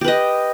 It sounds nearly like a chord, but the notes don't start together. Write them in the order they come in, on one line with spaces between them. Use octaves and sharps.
G4 B4 D#5